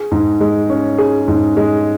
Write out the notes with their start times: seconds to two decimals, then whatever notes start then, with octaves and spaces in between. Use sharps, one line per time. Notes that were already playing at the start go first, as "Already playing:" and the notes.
Already playing: G#4
0.12 G#2
0.41 G#3
0.70 C#4
0.98 G#4
1.28 G#2
1.57 G#3